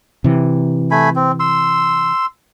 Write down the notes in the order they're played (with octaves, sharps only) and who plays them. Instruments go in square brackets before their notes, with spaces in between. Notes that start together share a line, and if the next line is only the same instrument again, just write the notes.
[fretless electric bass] C3 E3
[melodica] A3 G#5 B5
C4
C6 E6